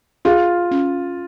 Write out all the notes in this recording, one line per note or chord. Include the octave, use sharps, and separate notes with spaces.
F4 G#4
C#4